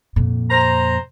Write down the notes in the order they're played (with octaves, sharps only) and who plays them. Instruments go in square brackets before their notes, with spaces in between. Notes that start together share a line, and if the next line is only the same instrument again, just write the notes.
[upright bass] F2 A#2
[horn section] C5 A#5